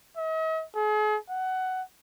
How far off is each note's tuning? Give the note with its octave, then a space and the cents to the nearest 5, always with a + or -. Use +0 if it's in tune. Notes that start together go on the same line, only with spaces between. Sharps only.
D#5 +45
G#4 +40
F#5 +15